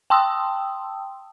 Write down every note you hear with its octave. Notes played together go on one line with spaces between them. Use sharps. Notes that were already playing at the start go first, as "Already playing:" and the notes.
G5 A5 C6 D#6 E6